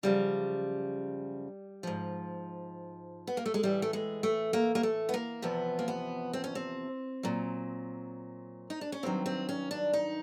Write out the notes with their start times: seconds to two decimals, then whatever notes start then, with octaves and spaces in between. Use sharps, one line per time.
0.03 F#2 C#3 F3 G3
1.83 G#2 F3
3.27 B3
3.37 A#3
3.46 A3
3.54 G#3
3.63 A2 E3 G3
3.82 A3
3.93 G#3
4.23 A3
4.53 A#3
4.75 A#3
4.83 A3
5.09 B3
5.14 A#3
5.42 E2 C3 F3 B3
5.79 A#3
5.88 B3
6.33 C4
6.44 C#4
6.55 C4
7.23 A#2 F#3
8.70 D#4
8.81 D4
8.92 C#4
9.03 G2 D#3 F#3 C4
9.26 C4
9.49 C#4
9.71 D4
9.93 D#4